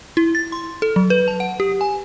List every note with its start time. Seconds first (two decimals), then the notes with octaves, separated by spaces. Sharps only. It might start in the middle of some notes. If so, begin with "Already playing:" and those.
0.17 E4
0.35 A6
0.52 C6
0.82 A4
0.96 F#3
1.10 B4
1.28 A5
1.40 F#5
1.60 G4
1.81 G#5